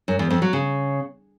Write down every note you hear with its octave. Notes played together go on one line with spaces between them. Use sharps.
F#2
E2
F2
F#3
C#3